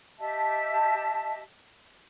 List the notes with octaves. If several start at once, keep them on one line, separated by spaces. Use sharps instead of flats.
G4 D#5 E5 A5